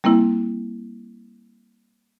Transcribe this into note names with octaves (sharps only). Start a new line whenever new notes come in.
G3 A#3 C4 E4